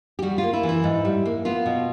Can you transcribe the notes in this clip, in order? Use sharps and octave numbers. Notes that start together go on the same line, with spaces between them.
G4
G3 F#4
F4
A#3
E4
E3
E4
G#2
G3
A#3
B3 F4
B2